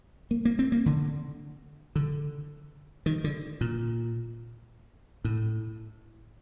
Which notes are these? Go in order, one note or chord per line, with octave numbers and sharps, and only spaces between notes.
A#3
A#3
C4
A#3
D3
D3
D#3
D3
A#2
A2